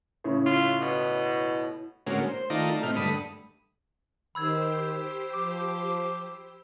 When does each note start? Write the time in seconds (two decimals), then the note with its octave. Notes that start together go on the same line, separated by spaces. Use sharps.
0.24 A2 C#3
0.46 F4
0.81 B2
2.07 A2 D3 G#3 A#3 C#4 F#4
2.28 C5
2.50 D#3 A3 D#4 F4 D5 A#5
2.71 A3
2.83 A2 C3 D#4 F6
2.96 G2 D3 A3 B5 D#6
4.35 D#3 G4 C5 B5 E6 G#6
5.33 F3 D6